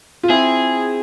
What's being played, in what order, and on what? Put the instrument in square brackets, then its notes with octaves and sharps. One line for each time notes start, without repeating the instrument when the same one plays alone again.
[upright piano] F4
[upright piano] C4 E4 [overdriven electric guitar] G#4